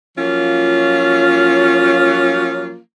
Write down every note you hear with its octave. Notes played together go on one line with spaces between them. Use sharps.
F3 F#3 A#3 C#4 F4